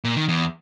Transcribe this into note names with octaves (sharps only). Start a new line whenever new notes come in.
A#2
D#3
E2